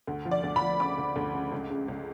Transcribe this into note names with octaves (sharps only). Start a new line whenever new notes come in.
D2
F3
D5
D2
B5
F3
C#3 D6
D2
D2
C#3
C#2
C#3
C#2